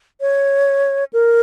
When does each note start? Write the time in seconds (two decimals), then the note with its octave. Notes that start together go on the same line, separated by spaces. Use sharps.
0.21 C#5
1.13 A#4